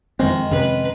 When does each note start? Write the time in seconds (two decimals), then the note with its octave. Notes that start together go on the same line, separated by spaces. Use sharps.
0.19 F2 D#3 E3 G#3 C4
0.51 F2 C3 C#4 B4